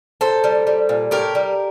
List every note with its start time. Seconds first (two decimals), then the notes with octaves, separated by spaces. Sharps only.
0.21 A#2 A4 C5
0.44 G3
0.67 G3
0.89 A#2
1.11 A2 G4 A#4
1.35 G3